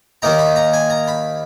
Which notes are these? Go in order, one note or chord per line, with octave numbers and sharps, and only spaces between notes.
D#2 D#3 A#3 D#4 A#5
B5
A#5
G#5
A#5
B5